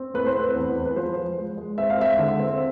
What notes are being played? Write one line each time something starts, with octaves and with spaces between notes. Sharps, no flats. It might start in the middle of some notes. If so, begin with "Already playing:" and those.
Already playing: C4
A2 B4
C5
C4 B4
E2
E2
B4
F3 C5
F3
G#3
G#3
C4 E5
F5
G#3 E5
D3
C4